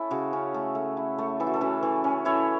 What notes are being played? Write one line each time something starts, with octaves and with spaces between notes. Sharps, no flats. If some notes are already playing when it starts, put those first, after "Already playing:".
Already playing: C#4 E4 A4
C#3 F#4
C#4
A3 A4
A3
E4
A3
E3 A4
F#4
A4
C#4 F#4 B4
E3
C#4
E4 A4 C#5